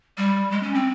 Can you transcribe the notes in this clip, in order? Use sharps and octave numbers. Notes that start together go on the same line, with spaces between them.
G3
G#3
C#4
C4